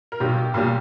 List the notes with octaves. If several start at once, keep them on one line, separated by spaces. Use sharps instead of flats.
A#4
B1 B2 G3 G4
B1 A#2 G3